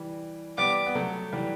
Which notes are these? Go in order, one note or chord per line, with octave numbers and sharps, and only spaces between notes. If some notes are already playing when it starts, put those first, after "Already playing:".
Already playing: E3 G3
G3 B3 D6
B3
F#3 A3
E3 G3